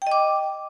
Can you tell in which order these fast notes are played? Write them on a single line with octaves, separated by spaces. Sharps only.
G5 D#5 D6